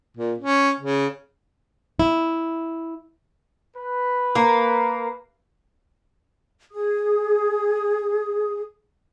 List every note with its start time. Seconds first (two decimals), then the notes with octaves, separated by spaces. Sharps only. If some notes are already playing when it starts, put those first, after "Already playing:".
0.17 A#2
0.38 C#4
0.80 C#3
1.99 E4
3.77 B4
4.35 A#3
6.72 G#4 D#6